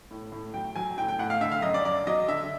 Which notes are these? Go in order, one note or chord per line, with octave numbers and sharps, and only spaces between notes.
A2
A2
F#3 G5
F#3 G#5
A2 G5
G5
A2 F#5
F5
D3 E5
F5
F#2 D#5
D5
F#2 D5
F#3 D#5
D3 E5